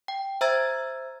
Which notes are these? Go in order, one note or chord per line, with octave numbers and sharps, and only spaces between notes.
G5
C5 E5 A#5 E6 G#6 A6